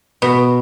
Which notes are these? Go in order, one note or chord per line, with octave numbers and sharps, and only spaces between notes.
B2